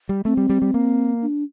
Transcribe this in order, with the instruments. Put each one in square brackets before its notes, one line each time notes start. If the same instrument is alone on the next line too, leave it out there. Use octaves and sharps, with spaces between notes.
[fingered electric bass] G3
[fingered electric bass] A3 [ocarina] C4
[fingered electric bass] G3
G3
G3
A#3
[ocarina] D4